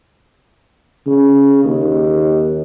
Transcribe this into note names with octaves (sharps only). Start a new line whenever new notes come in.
C#3
D#2